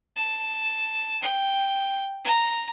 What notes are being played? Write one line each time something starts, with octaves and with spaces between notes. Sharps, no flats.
A5
G5
A#5